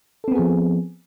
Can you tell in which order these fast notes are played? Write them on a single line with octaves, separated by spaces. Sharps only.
A4 C4 B3 G#4 F3